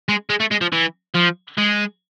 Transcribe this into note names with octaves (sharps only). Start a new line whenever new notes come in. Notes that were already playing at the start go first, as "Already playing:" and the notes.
G#3
G#3
A3
G#3
F3
E3
F3
G#3